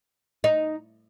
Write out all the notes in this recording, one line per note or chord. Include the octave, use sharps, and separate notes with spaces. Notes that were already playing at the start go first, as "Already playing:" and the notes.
D#4